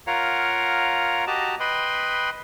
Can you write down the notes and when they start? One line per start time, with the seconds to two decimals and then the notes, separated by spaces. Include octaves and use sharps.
0.07 F4 A#4 C#5 F5 F#5 A#5
1.27 F#4 G4 D#5 A5 A#5
1.60 B4 D#5 G5 B5 C6